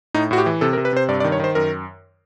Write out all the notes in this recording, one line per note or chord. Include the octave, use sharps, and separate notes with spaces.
A2 D#4
A2 F#4
G4
E3
C3 A4
A#4
C3
B4
C3 C5
G2 D5
D5
D#3
C#5
D#3 C5
F#2 A#4